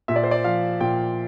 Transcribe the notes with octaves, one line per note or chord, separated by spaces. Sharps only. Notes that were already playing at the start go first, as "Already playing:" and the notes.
A#2 E5
D5
C5
D5
F3 F5
A#2 G5